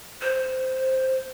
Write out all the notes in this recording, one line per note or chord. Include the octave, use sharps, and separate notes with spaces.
C5